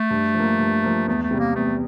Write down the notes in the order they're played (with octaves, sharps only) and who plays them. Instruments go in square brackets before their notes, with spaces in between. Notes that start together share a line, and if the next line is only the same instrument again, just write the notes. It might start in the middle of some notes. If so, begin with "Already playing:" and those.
Already playing: [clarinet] A3
[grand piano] G2
F3 A#3
G2
F3 A#3
[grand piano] E2 [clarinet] A3
[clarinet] A3
[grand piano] C3 G3
[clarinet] A#3
[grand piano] E2 [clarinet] A3